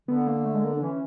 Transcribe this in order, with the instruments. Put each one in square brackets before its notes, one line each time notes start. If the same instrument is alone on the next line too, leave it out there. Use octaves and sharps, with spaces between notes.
[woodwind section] D3 [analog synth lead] B3
[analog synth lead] A#3
A3
G#3
A#3
D4
[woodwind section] E3 [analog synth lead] C#4